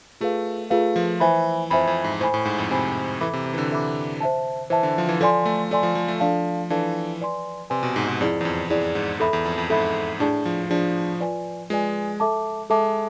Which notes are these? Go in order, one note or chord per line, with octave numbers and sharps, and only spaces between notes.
A3 F4 G#4 B4 F5
A3 F4 G#4 B4 F5
F3
E3 C5 E5 G#5 B5
F2 C5 E5 G#5 B5
F2
G#2
A2 C5 G#5 B5
A2
G#2
F2
C3 C5 G#5 B5
E3 A4 E5 B5 D6
C3
C3
E3
D3
A4 E5 B5 D6
C5 E5 A5
E3 C5 E5 A5
D3
F3
E3
F3 A4 D5 G#5 C6
A3
A3 A4 D5 G#5 C6
F3
F3
A3
F3 D4 A4 D5 F5 A5
E3 D4 A4 D5 F5 A5
B4 D5 G#5 C6
C3 B4 D5 G#5 C6
B2
G#2
G#2
F2 E4 G#4 D5
E2
F2
E2 E4 G#4 D5
G#2
E2 A4 E5 B5
E2
F2
F2
G#2 A4 E5 B5
A2 D4 G#4 D5 A5
F3
F3 D4 G#4 D5 A5
F4 B4 D5 G#5
G#3 F4 B4 D5 G#5
A4 E5 A5 D6
G#3 A4 E5 A5 D6